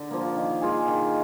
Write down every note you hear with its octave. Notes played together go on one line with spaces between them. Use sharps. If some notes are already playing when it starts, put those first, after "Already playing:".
Already playing: D3
F3 A#3
D#3
A#3 F4 G#4
D#3